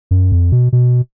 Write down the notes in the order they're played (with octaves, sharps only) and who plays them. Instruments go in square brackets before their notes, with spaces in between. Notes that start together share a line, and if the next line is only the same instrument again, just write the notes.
[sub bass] F#2
F2
B2
B2